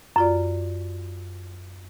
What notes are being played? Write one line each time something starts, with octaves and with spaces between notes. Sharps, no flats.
F#2 F4 D5